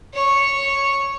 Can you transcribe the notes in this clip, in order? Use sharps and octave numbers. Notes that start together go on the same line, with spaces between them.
C#5 C#6